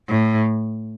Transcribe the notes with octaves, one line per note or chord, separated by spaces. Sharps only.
A2